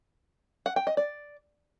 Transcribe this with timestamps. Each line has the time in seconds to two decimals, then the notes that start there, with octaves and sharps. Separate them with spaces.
0.66 F#5
0.76 G5
0.87 D#5
0.97 D5